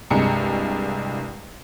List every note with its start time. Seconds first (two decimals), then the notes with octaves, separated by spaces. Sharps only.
0.11 C2 G2 G#3 A#5 C#7